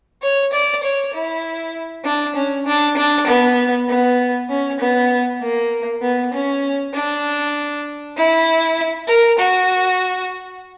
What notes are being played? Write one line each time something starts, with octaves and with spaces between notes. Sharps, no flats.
C#5
D5
C#5
E4
D4
C#4
D4
D4
B3
B3
C#4
B3
A#3
B3
C#4
D4
E4
A#4
F#4